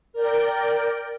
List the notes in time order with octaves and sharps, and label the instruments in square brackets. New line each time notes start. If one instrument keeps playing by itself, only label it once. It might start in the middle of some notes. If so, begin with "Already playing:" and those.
[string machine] A#4 D5 G5